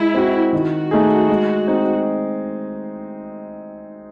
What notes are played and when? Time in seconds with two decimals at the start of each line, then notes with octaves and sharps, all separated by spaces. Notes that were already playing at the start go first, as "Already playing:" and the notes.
Already playing: G#3 E4
0.14 C4 F#4
0.53 D#3 F#4
0.91 A3 D#4 G#4
1.29 G#3
1.67 C4 D#4